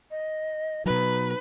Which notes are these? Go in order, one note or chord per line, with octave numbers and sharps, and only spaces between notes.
D#5
B2 F#3 D#4 B4